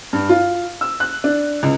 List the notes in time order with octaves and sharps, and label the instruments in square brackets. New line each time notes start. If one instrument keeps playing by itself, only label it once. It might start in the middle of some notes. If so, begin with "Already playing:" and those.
[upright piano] G2
F4
E6
F#6
D4
C#2